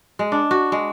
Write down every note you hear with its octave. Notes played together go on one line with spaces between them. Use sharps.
G#3
D4
F#4
G#3